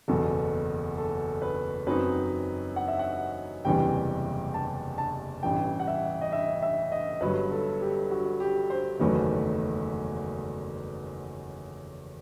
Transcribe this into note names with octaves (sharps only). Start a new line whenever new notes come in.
F#1 E2 B2 A4
A4
B4
F#2 F#3 C4 D#4 B4
F#5
E5
F#5
F#1 E2 C3 E3 G3 G5
A5
A5
A1 G2 E3 G5
F#5
E5
D#5
E5
E5
D#5
G1 G2 F#3 B4
A4
G4
F#4
G4
C5
F#1 E2 D#3 F#3 A3 B4